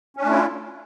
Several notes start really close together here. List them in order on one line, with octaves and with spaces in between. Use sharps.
C#4 D4 A3 E4 F4